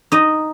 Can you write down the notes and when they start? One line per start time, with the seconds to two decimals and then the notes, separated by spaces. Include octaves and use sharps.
0.12 D#4 D#5